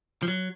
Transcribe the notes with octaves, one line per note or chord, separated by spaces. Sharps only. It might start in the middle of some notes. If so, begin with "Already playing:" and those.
F3
F#3